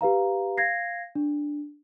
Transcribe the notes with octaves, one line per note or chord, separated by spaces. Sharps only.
G4 B4 F5 A#5
F5 G#6 A#6 C7
D4